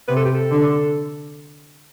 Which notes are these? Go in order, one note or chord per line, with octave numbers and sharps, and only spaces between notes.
C3 B4
A4
G4
A4
D3